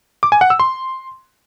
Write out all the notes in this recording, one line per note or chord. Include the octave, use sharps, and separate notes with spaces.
D6
G#5
F#5
E6
C6